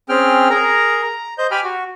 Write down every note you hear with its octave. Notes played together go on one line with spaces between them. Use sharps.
C4 C#4 G#4 G5 F6
G#4 A#4 A#5
A#5
C5 D#5 G6
G4 G5 G#5 B5 F6
F#4